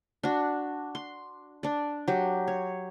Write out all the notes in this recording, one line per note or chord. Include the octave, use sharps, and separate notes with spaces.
D4 F#4
C6
D4 D5
F#3 G4
C#5